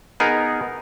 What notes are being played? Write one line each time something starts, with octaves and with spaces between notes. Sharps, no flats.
B3 D#4 G#4 A#4